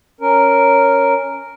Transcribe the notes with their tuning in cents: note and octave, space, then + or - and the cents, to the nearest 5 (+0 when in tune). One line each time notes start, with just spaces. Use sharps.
C#4 +0 A#4 +0